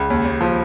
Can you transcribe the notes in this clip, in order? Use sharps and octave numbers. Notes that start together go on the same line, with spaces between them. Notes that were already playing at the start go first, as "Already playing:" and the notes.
Already playing: C#2
D#2
D#2
F3